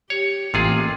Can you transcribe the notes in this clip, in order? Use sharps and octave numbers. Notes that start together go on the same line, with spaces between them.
G4 C#5
A1 C3 A#3 F4 G#4